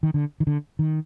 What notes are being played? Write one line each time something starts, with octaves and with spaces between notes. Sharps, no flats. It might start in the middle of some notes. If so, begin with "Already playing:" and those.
D#3
D3
D#3
D3
D#3